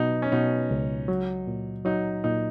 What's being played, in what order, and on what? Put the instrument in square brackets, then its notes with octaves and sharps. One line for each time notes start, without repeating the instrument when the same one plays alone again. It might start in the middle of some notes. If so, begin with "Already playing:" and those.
Already playing: [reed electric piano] B2 F#3 [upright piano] D#4
[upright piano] C#4
[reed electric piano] B2 [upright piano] D#4
[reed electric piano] C#2
F#3
A#2
[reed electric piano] F#3 [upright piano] D#4
[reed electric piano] A#2 [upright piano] D#4